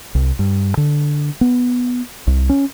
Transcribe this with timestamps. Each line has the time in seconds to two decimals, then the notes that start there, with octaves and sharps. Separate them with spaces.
0.15 C2
0.39 G2
0.77 D3
1.41 B3
2.27 C2
2.49 C#4